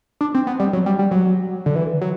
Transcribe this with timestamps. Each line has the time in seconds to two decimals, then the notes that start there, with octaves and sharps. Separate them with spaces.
0.21 D4
0.35 C4
0.47 B3
0.60 G3
0.73 F#3
0.86 G3
0.99 G3
1.11 F#3
1.66 D3
1.75 E3
2.01 F#3